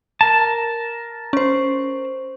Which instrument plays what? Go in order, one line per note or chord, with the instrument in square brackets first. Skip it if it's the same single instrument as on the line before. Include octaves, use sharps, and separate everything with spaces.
[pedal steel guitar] A#4 A5
[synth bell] C#4 C5